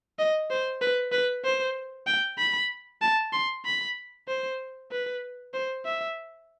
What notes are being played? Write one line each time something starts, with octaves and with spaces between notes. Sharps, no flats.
D#5
C5
B4
B4
C5
G5
B5
A5
C6
B5
C5
B4
C5
E5